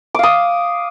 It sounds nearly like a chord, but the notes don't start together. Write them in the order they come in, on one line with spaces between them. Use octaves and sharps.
D6 F5 D#6